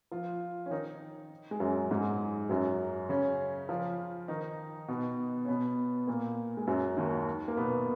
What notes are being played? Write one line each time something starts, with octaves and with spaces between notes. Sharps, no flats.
F3 F4
C#4
D#3 D#4
G#3
F#2 F#3
G#2 G#3
F#2 F#3
C#3 C#4
F3 F4
D#3 D#4
B2 B3
C#4
B2 B3
A#2 A#3
G#3
F#2 F#3
D#2 D#3
A#3
B2 B3